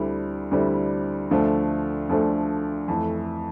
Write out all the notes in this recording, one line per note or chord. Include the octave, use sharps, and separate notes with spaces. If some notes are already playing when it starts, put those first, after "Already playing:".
Already playing: D2 D3 G3 C4 E4
D2 D3 G3 C4 E4
D2 D3 F3 A3
D2 D3 F3 A3
F2 E3 A3